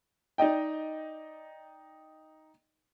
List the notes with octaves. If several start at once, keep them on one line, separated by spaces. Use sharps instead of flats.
D#4 D5 D#5 G5